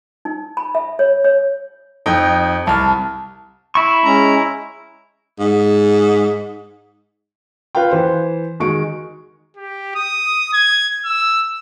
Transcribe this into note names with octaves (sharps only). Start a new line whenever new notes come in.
D#4
B5
E5
C#5
C#5
F2 D#4 G5
C2 A5 F6
E4 C#6
G#3 C#4 A#5
G#2
F4 B4 F5 G5
E3 C5
D#3 G#3 F#4 C#6 D7
G4
D#6
G#6
E6